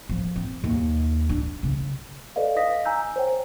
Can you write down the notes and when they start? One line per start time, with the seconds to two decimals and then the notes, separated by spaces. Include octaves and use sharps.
0.09 F3
0.36 C4
0.64 D#2
1.29 D4
1.63 C#3
2.36 A4 B4 D5 D#5 F5
2.56 D#5 F5 D#6 A#6 B6
2.85 G#5 A#5 E6 G6
3.16 C5 C#5 G5